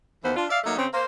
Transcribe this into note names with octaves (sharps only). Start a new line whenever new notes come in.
D#2 E3 B3 C5
D4 F4
D5 E5 F5
F#3 A3 A#3 D#4
C#3 C4
A#3 C5